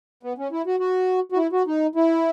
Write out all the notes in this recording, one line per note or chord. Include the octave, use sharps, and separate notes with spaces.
B3
C#4
E4
F#4
F#4
F#4
E4
F#4
D#4
E4